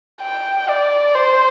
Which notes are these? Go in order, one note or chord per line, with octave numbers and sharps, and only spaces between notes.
G5
D5
C5